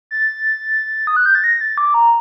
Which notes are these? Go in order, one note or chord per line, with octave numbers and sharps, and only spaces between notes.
A6
D#6
F#6
G6
A6
A#6
A6
D6
A#5